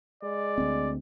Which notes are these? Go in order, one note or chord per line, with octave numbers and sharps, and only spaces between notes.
G#3 D5
D2 C4